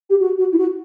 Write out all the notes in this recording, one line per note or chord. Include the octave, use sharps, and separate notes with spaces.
G4
F#4
F#4
E4
F#4